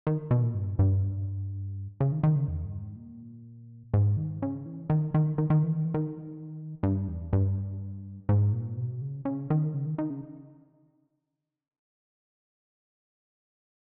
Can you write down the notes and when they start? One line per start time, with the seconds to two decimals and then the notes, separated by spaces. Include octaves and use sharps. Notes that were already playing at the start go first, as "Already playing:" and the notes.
0.07 D#3
0.31 B2
0.43 A#2
0.55 G2
0.79 G2
2.00 C#3
2.12 D#3
2.23 D#3
2.36 C#3
2.48 E2
2.65 G2
2.81 G#2
2.96 A#2
3.94 G#2
4.17 D#3
4.42 C#3
4.66 E3
4.90 D#3
5.14 D#3
5.38 D#3
5.50 D#3
5.63 E3
5.75 D#3
5.85 E3
5.94 D#3
6.83 G2
7.08 E2
7.33 G2
8.29 G#2
8.53 A#2
8.77 B2
9.02 C#3
9.25 C#3
9.50 D#3
9.74 C#3
9.86 D#3
9.98 D#3
10.10 C#3